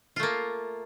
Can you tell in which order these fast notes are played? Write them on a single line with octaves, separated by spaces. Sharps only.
F4 A3 A#3